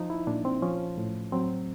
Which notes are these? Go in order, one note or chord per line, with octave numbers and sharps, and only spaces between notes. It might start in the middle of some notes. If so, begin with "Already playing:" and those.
Already playing: F3 D#4
E4
A#2 D4
C4
F3 C#4
A2
F#3 C4